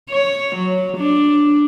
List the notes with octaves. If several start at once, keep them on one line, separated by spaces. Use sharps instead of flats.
C#5
F#3
D4